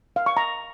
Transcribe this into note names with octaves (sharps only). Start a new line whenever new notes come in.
F5
C#6
A#5